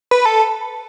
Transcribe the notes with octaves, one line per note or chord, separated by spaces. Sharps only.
B4
A4